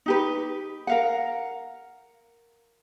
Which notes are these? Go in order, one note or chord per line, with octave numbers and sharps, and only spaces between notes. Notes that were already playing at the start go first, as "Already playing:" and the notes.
D#4 G4 B4
A#4 F5 F#5